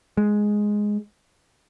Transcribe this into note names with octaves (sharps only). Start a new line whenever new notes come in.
G#3